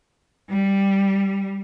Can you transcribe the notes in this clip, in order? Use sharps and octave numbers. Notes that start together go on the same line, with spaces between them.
G3